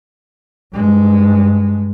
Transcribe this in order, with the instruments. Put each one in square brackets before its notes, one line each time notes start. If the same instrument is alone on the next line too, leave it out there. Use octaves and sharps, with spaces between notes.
[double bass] G2 G#3